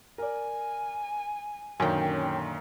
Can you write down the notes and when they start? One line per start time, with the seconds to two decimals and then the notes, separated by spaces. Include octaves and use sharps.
0.18 A#4 D5 G#5
1.80 F#2 A#2 D3 D#3 C#4 G5